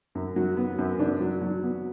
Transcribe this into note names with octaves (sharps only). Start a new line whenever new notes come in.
F#2
F#3
B3
F#2
D4
F#3
F#3
B3